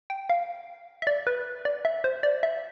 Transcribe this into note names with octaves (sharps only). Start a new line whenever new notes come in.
G5
F5
E5
D5
B4
D5
E5
C5
D5
E5